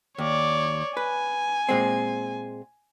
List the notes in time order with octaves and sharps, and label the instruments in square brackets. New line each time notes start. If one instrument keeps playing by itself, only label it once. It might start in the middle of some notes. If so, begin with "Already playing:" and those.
[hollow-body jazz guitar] D#2 [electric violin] C#5 D5
[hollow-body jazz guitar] B4 [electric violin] G#5
[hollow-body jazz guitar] A#2 G#3 C4